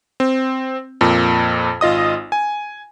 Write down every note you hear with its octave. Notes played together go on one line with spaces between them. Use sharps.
C4
F2 A#2
G#1 F4 D#5 D#6
G#5